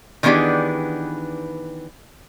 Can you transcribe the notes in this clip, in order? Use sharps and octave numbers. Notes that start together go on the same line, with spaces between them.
D#3 E3 B3 D4 G4 G#4